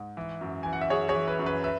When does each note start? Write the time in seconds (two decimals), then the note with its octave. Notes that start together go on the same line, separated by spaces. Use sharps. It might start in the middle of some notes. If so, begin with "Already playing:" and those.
Already playing: G#2
0.17 E3
0.41 F#2
0.63 E3 G#5
0.73 F#5
0.81 E5
0.90 F#2 G#4 C#5
1.09 G#4 C#5
1.15 E3
1.28 B4
1.39 F#2
1.46 B4
1.64 B4 E5